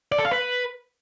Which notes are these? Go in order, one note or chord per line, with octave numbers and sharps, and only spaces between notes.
D5
A4
F5
B4